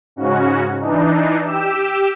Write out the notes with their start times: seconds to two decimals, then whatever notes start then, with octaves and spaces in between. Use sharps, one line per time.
0.16 G#2 C#3 C#4 F#4
0.80 E3 D4 D#4
1.44 G4 E6